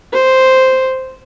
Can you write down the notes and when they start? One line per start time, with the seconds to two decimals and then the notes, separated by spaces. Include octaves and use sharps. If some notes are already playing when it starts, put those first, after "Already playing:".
0.13 C5